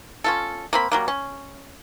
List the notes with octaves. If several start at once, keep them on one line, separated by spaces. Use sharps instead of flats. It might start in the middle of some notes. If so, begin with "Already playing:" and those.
C#4 F4 A4
A#3 C4 B5
F#3 G3 A#3
C#4